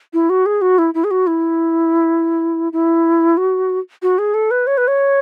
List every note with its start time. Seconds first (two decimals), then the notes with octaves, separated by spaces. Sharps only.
0.13 E4
0.29 F#4
0.46 G#4
0.61 F#4
0.78 E4
0.94 E4
1.04 G#4
1.11 F#4
1.27 E4
2.73 E4
3.37 F#4
4.02 F#4
4.18 G#4
4.34 A4
4.51 B4
4.67 C#5
4.77 B4
4.88 C#5